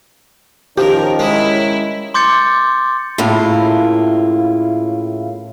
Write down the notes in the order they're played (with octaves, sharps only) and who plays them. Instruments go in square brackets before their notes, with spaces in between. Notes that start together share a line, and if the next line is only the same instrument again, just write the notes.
[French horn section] D#3 C#4 [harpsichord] F3 [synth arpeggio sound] G4 [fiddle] A#4
[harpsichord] G#3 [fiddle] E4
[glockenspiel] C6 D6 G6 A6 C#7
[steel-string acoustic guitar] A2 C#3 A#3 E4 F4